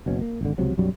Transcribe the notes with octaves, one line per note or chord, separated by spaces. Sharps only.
F#1 B2 C#4
A#3
G#1 D3
C#2 C3 F3 F#3
B1 F#2 F#3 G3